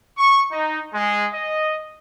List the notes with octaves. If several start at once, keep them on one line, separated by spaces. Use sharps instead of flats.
C#6
D#4
G#3
D#5